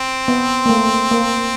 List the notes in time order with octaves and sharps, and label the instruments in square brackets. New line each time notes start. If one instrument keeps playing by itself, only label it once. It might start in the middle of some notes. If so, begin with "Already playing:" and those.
Already playing: [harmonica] C4
[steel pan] B3
A#3
A3
A#3